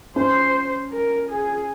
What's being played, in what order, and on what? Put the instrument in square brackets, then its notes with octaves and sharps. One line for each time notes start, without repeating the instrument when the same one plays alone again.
[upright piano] C#4 [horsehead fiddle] C5
[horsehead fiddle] A#4
G#4